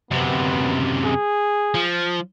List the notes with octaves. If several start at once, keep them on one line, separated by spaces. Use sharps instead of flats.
F#2 C3 B3
G#4
F3